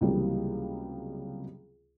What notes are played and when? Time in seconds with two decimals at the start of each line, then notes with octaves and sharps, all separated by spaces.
0.01 C#2 C3 E3 F#3 G3 A#3